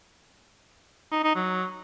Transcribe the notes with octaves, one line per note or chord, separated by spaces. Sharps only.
D#4
D#4
F#3